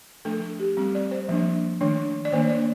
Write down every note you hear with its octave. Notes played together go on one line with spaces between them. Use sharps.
F3 A3 D4 A4
A4
G4
G3 C4
D5
C5
F3 A#3 D4
D#3 A3 D4
D5
D#3 A#3 D4 C5
D5